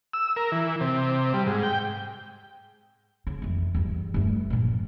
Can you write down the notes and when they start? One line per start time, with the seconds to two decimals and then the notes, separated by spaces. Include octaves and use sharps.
0.13 E6
0.36 A#4
0.52 E3
0.81 C3
1.34 G3
1.47 G#2
1.63 G5
3.27 C#3
3.42 F2 E3
3.75 E2 G2
4.14 G2 A3
4.50 A#2 F3